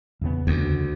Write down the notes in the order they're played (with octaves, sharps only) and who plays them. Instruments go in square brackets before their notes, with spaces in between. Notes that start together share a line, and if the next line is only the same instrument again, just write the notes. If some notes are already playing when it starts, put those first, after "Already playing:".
[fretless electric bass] E2 C#3 B3
[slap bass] D2